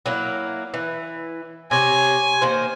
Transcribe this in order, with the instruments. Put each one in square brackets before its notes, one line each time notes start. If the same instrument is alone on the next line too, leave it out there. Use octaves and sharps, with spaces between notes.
[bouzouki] F#3 A#3 E4
E3
[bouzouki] C3 C#5 [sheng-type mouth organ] G#5
[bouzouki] D#3 A#3 C5